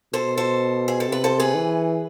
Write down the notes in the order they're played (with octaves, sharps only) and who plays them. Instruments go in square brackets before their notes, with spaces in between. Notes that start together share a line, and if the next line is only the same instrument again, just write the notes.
[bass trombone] B2 [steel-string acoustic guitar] A4 C5
[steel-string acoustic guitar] A4 C5
G#4
A4
[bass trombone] C3 [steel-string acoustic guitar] B4
[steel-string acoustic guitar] A4 C5
G#4 B4
[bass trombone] E3